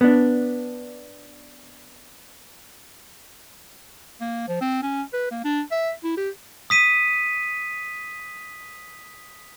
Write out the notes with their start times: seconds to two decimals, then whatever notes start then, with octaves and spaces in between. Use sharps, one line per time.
0.01 B3 D4
4.21 A#3
4.48 F3
4.61 C4
4.82 C#4
5.13 B4
5.31 A#3
5.44 D4
5.72 E5
6.04 E4
6.17 G4
6.70 D#6 B6 D#7